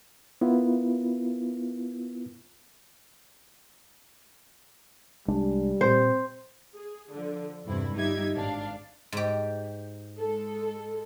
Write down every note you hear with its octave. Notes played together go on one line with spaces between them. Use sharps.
B3 E4 F4 A#4 B4
C2 G3 G#3 D4
A#2 C4 C5
G#4
D3 F3
E2 G2 C3 E4
G1 G3 D#4 G4 E5 G#6
G#1 D4 F5
G#2 G4
G#3 A4